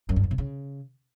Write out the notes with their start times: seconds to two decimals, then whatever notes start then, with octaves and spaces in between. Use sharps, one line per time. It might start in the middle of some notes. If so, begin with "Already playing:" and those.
0.09 F#2
0.16 G2
0.24 F#2
0.31 C3
0.38 C#3